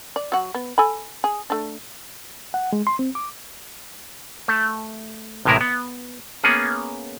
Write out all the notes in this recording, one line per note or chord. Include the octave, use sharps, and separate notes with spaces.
D5
F#3 F#4
B3
A4 G#5 B5
G#4
A3 D4
F#5
G#3
C6
C4
D6
A3
A1 A2 C3 G#3 E4 A#4
B3
A#3 B3 C#4 G#4